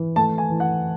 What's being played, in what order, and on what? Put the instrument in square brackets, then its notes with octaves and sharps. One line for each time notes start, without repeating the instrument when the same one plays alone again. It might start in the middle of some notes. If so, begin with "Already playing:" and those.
Already playing: [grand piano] E3
A3 A5
G#5
E3
F#5